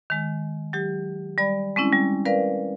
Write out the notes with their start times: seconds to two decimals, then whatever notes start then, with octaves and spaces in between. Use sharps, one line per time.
0.10 D#3 G#3
0.73 F#3 G4
1.38 G3 D5 B5
1.76 G#3 C4 C#4 E4
1.93 G3
2.25 A#4 B4 D5 F5